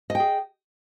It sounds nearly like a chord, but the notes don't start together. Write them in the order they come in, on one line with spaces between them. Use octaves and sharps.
D#5 G5 G#4